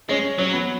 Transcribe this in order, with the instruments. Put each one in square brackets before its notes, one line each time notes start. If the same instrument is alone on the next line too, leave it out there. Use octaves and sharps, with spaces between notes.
[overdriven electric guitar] G#3 [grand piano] C#4
[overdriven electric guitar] F#3 [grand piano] C#4
[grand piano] B3